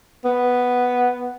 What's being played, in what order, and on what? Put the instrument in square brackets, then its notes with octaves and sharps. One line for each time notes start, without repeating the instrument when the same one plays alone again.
[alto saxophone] B3